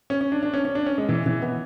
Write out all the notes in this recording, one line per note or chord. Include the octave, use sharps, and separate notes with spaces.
C#4
C#4
D4
D4
C#4
C#4
D4
C#4
G#3
E3
E3
B3